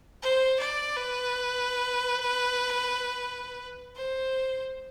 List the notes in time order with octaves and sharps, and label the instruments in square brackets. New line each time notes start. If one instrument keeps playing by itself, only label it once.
[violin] C5
D5
B4
C5